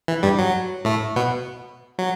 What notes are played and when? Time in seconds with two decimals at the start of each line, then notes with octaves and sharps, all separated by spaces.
0.08 E3
0.23 G2 G3
0.38 F#3
0.85 A2 A3
1.16 B2 B3
1.99 F#3